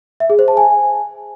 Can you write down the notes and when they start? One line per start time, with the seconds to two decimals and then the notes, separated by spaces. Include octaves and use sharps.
0.20 E5
0.30 G#4
0.39 C5
0.48 A5
0.57 G#5